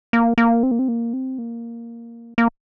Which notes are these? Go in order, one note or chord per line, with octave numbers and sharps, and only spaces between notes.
A#3
A#3
C4
A#3
C4
A#3
C4
A#3
A#3